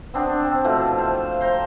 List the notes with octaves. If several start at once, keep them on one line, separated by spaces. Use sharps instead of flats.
B3 C4 D4
C4
B2 F3 A3 E4
C5 F5
C5 G5 A#5 C6